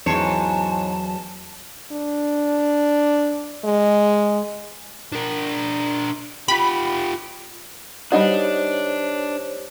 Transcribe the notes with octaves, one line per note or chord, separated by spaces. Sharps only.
E2 G#2 F#3 C#5 A5 C7 E7
D4
G#3
D4 A#4
F4 G4 B5
G3 D4 D#4 F#4 C5 C#5